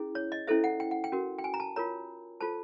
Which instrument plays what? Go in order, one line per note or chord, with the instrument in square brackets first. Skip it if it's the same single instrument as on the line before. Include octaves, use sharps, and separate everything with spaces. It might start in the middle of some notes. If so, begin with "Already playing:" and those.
Already playing: [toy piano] C#4 E4 G#4
C#5
D#5
C#4 E4 A4 C5 E5
F#5
G5
F#5
G5
C#4 F#4 A#4
G5
G#5
A#5
A5
F4 A#4 C#5 A#5
F4 A4 C5 A5